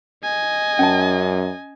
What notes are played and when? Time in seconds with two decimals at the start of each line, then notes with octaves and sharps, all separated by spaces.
0.24 D#5 G#5
0.79 F#2 C#4 A5